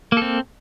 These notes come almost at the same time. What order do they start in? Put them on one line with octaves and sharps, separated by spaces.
A#3 A4 C4